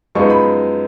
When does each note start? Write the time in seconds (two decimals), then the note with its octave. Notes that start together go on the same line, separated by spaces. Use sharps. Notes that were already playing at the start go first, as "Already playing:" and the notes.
0.15 F#2 F3 G#3 B3 D#4 C#6
0.30 B5